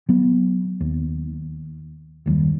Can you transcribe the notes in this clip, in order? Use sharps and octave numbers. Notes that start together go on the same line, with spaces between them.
F#3 B3
D#2
F#1 D#2 D#3 G3